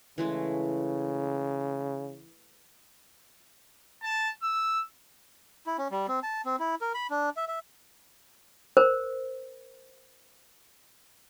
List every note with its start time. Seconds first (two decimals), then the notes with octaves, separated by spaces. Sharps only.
0.18 C#3 E3 G#3 A3
4.03 A5
4.43 E6
5.66 E4
5.78 C#4
5.91 G3
6.08 C4
6.23 A5
6.45 C4
6.59 E4
6.81 A#4
6.94 B5
7.10 D4
7.37 E5
7.48 E5
8.77 A#4 C5